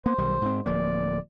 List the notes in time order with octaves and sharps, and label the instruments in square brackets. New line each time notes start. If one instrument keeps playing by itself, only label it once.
[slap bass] A#3 B3 [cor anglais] C5
[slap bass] B1 D#3 G3
G#2 C4
[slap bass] D1 F3 A#3 [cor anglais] D5